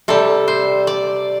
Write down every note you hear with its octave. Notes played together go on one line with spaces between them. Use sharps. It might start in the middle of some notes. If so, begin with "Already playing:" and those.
C3 G3 A4
C5
D5